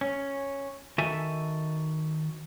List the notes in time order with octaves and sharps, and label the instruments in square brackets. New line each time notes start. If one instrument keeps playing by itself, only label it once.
[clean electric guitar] C#4
D#3 F#4 A4 E5 G#5